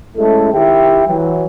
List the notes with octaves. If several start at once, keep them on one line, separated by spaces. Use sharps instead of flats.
G#3 A3 C#4 E4 A4
D#3 E4 G4 E5 G5
E3 F#3